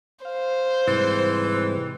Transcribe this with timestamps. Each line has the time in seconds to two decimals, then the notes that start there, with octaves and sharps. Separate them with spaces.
0.25 C5 F5
0.88 G#2 C3 E3 G3